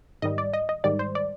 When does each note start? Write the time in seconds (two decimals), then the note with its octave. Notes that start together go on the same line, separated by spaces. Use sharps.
0.22 G#2 D#3 G3 D#5
0.38 D5
0.53 D#5
0.69 D#5
0.84 G#2 D#3 G3 D5
0.99 C5
1.15 D5